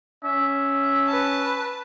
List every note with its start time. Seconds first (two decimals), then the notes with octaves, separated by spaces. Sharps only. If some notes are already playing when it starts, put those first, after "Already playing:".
0.24 C#4 E5
1.08 B4 A5